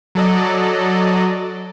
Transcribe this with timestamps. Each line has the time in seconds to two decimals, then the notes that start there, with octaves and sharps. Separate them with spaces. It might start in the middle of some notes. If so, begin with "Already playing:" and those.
0.15 F#3 A4 D5 D#5